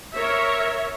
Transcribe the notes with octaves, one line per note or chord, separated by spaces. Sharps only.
A#4 C#5 E5